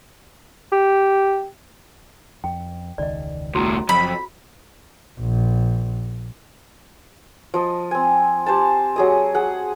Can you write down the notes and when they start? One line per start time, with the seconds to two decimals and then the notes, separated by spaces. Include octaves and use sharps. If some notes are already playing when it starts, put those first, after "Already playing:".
0.72 G4
2.44 F2 G5
2.98 E1 C#2 D#3 D5 D#5
3.55 C2 A2 F#4 A#5
3.89 F#1 F2 F3 F#3 B5
5.20 A#1
7.54 F3 D#5
7.91 C4 G#5
8.46 G4 C5 G#5 A5
8.96 F#3 G#4 D#5
9.35 G#4 F#5